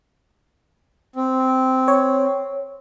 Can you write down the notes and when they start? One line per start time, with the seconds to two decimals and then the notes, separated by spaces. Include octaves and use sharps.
1.16 C4
1.88 C#5